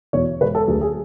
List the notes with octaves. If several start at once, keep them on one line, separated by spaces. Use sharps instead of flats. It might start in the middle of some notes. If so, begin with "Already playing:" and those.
E2 B2 C#5
E1 B4
A4
D2 D3 F#3 G#4
G#4